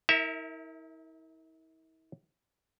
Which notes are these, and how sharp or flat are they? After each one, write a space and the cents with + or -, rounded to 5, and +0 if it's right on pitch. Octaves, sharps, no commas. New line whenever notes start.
E4 -40 A#4 -15 E5 -10